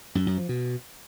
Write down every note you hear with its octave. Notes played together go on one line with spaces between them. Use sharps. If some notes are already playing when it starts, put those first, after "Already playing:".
F#2
F#2
F3
B2